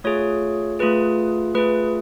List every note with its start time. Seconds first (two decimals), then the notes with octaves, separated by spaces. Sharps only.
0.04 A3 F4 G#4 C#5
0.79 A3 F4 G#4 B4
1.55 A3 F4 G#4 B4